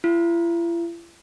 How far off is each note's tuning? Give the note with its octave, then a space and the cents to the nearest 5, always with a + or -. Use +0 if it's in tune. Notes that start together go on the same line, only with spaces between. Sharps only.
E4 +45